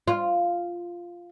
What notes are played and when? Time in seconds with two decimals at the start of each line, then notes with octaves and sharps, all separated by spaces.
0.08 F4